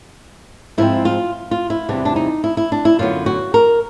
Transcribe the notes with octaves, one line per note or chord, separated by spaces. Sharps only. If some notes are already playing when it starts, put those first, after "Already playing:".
G#2 F3 G#3 C4 E4
F4
F4
E4
E2 C3 E3 G3 D4
D4
D#4
E4
E4
D4
E4
F#2 D3 F#3 B3 F4
F#4
A#4